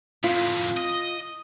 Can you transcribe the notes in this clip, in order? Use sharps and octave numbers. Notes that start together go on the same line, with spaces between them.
F2 A2 F4
D#5